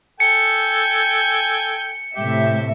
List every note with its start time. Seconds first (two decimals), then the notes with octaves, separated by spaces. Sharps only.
0.20 A4 G5 G#5 C#7
2.16 A2 C3 G4 E5